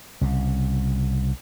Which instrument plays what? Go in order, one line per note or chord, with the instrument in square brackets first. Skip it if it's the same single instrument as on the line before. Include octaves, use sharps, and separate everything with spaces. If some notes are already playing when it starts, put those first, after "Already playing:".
[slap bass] C2 C#3